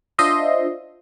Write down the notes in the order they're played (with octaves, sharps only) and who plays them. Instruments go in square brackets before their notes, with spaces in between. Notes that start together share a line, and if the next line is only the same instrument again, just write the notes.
[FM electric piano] D4 F4 C5 D#5 E5 C6